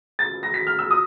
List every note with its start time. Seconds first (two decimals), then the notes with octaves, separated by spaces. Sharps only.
0.19 A6
0.43 A#6
0.54 B6
0.67 F6
0.79 E6
0.91 D#6